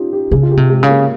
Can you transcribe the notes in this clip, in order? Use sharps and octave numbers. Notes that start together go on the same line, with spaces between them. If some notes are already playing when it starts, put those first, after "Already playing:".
Already playing: C#4 D#4 F4 G4
G4
C#3 G#4
F4
G4
C3
G#3
C#3
A#3